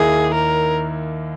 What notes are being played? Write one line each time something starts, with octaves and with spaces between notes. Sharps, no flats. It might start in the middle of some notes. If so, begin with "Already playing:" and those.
Already playing: D#2 D#3 A#3 E4 G#4
A#4